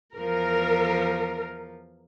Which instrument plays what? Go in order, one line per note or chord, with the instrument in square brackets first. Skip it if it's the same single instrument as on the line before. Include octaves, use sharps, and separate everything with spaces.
[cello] E2 F3 [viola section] A#4